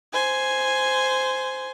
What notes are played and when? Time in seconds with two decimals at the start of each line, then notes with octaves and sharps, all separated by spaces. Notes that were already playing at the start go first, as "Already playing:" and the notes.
0.13 C5 G#5